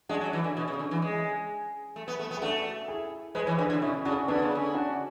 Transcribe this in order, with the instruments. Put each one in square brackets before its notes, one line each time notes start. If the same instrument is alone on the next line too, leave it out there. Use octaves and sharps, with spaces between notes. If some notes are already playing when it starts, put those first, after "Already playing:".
[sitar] G#3 [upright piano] D4 F#4
[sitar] F#3
E3
D3
B2
C#3
D3
E3
G#3
A3
B3
A3
B3
[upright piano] G#4
[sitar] A3 [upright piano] D4 F#4
[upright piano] E4 G#4
[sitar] G#3 [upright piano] B4
[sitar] E3 [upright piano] C#5
[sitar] D3 [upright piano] G#4 B4
[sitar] D3
[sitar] B2 [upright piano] C#4 E4
[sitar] C#3 [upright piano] D4 F#4
[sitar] D3 [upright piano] B3 D4
[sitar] C#3
D3
[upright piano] D4 F#4